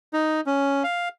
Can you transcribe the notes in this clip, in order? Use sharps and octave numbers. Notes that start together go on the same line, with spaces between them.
D#4
C#4
F5